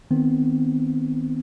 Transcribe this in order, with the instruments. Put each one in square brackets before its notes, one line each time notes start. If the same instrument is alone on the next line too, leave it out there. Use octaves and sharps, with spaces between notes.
[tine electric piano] D#3 B3 C4